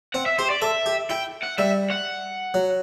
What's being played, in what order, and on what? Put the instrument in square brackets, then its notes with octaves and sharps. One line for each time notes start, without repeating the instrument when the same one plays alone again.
[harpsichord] C4 [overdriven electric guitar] F#5
[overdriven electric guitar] E5
[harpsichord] G4 [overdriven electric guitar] C5
[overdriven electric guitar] D5
[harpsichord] A4 [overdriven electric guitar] E5
[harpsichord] G4
[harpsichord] E4 [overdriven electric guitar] G5
[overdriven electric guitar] F#5
[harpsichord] G3 [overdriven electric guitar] E5
[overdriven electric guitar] F#5
[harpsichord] F#3